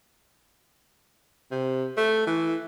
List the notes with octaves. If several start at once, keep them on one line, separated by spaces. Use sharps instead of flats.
C3
A3
E3